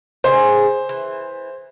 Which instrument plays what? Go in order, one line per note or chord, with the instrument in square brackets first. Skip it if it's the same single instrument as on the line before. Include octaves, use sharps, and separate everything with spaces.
[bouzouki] C#3 G#4 [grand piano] C5
[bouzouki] E3